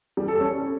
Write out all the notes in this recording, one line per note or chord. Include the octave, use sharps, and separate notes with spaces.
G3
A4
C#4